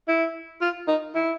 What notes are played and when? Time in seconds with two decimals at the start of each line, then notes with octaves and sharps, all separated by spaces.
0.08 E4
0.61 F4
0.88 D#4
1.15 E4